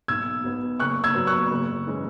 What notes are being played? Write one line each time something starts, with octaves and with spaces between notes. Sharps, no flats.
B1 E6 G#6
B2 B3
F#1 C#6 F#6
E6 G#6
F#2 F#3 B3
C#6 F#6
F#1
E3 G#3 C#4